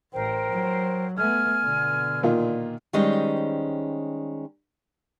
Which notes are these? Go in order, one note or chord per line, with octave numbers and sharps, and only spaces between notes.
A1 A#4 C5 G5
F#3
A3 B3 G#5 F6 G#6
B2 D3
A#2 D#3 F4
D#3 G3 G#3 C#4 C5 D#5